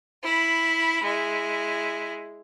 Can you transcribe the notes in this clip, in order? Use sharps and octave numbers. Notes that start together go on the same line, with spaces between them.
E4 B5
G#3 E4